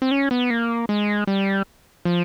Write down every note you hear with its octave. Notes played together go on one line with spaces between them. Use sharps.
C4
C#4
B3
A#3
G#3
G3
F3